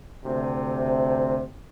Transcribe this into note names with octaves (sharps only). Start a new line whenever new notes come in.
D2 C3